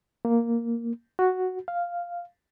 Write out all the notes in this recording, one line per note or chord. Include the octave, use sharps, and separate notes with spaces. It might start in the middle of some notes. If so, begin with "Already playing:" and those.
A#3
F#4
F5